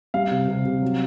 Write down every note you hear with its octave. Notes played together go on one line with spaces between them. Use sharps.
G3 F5
C3
C3
C3
F#3